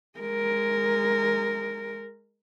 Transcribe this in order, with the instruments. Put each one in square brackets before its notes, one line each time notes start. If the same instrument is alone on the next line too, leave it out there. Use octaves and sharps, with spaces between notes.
[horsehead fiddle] G#3 A#4